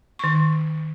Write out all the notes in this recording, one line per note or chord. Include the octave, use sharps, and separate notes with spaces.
D#3 C#6